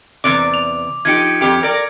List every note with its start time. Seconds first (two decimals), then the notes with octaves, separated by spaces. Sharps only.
0.24 E2 C3 D5 D6
0.54 F7
1.05 F3 D#4 G4 G#6 C#7
1.41 F2 G4 G5
1.63 A#4 D5